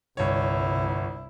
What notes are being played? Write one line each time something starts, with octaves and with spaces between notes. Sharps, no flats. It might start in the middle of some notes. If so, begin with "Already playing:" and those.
G1 C2 E4 C#5